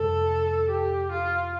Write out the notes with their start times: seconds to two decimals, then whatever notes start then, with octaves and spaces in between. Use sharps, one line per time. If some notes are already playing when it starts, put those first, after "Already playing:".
Already playing: F2 C3 G3 A4
0.70 G4
1.12 F4